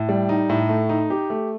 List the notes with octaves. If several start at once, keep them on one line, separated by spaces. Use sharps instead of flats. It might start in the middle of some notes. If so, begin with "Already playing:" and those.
Already playing: A2
G3
D#4
A2
A3
D#4
G4
A3